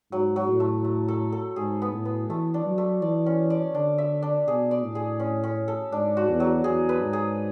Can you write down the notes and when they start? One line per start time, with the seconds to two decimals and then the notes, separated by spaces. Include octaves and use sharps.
0.11 G#2 F#3
0.36 F#3
0.48 A2
0.60 A3
0.84 A3
1.08 A4
1.32 A4
1.56 G#2 G#4
1.82 B3
1.93 A2
2.05 B3
2.30 E3 A3
2.54 D4
2.66 F#3
2.78 A3
3.02 E3 D5
3.26 C#4
3.50 D5
3.75 D3 D4
3.98 E5
4.22 D4
4.47 B2 G#4
4.71 D5
4.83 A2
4.95 G#4
5.20 C#4
5.44 C#4
5.68 A4
5.92 G#2 D4
6.17 F#4
6.29 E2
6.40 F#3
6.64 E2 G#4
6.89 B4
7.01 G#2
7.13 G#4